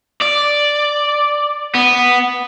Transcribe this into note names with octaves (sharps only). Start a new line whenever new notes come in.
D5
B3